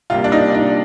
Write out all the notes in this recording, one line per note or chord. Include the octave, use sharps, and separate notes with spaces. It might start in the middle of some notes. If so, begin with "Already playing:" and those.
C3 G3 A#3 F4
D4
D#4
D4